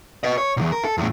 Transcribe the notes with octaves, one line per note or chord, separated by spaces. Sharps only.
B4 D#5
C#5
B1 E2
A#4
A4
E2 A2